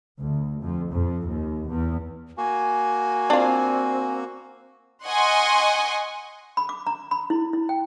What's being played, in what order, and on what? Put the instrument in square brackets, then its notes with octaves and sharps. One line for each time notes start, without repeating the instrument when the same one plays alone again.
[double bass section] D2
F2
F2
D#2
E2
[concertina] A#3 F#4 [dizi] G#5
[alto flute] C4 [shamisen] D4 F4
[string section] D#5 F#5 G#5 C6 C#6 F#6
[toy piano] B5
D6
A#5
B5
E4
E4
G5